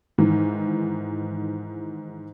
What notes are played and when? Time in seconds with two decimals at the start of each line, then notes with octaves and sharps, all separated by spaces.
0.18 G#2 D#3 E3